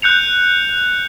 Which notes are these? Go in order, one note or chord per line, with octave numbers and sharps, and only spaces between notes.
F#6 G6 C#7 F7